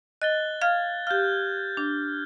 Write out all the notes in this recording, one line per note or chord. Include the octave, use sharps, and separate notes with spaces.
D#5 F#6 A6 G7
F5 F6 G#6
G4 F5 F6 G6
D4